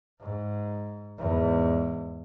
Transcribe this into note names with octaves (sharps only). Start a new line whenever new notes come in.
G#2
E2 G#2